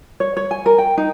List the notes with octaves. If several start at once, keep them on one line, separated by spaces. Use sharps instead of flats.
C#5
C#5
G#5
A#4
G5
D#4